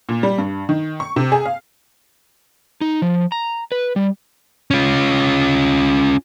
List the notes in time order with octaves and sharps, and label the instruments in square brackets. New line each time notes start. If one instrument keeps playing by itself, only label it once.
[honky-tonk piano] A#2
G3
G2
D#3
C#6
C3
G#4
F5
[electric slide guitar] D#4
F3
A#5
B4
G3
[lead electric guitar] C#4 F4